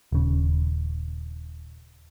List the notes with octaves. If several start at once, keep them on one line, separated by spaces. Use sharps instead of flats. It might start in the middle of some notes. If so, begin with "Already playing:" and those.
D#1 C#3